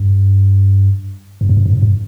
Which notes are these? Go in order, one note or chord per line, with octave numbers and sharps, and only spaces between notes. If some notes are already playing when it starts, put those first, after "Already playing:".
Already playing: G2
F#2
G2
F#2
G2
F#2
G2